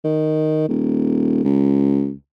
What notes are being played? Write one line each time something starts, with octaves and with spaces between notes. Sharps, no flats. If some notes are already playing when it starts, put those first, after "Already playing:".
D#3
D#1
C#2